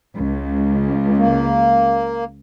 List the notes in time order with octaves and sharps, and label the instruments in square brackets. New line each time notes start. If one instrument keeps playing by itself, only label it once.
[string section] C#2
[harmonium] A#3